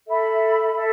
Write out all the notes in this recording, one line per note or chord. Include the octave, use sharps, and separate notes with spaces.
A4 E5 B5
A4 E5